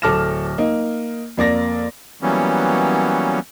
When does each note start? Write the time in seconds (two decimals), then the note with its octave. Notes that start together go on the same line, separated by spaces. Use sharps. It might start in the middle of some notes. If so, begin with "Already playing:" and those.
0.02 D1 A4 D6 F6 A#6 E7
0.58 A#3 D#4
1.37 F2 A#3 D5 A#6
2.22 E3 F#3 G3 A#3 B3 C#4